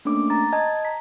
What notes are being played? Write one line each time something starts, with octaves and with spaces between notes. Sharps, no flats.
A3 A#3 C#4 D4 D6
A#5 A6
D#5 A5 G#6
A#5 B6